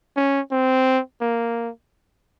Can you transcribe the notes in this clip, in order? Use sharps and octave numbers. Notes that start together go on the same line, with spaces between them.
C#4
C4
A#3